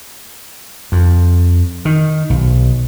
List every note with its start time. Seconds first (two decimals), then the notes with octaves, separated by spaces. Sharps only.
0.92 F2
1.85 D#3
2.30 B1